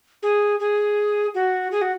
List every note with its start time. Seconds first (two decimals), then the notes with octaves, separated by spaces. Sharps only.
0.23 G#4
0.60 G#4
1.34 F#4
1.72 G#4
1.82 F#4